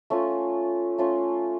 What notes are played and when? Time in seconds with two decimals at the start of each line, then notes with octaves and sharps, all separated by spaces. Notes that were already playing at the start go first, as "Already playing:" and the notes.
0.10 A3 C#4 F4
0.98 A3 C#4 F4